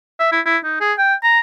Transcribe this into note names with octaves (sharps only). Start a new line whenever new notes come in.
E5
E4
E4
D#4
G#4
G5
A#5